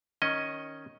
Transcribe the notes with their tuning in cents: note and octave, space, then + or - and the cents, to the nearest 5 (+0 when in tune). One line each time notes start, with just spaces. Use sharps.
D#3 +0 C#4 +0 D#5 +5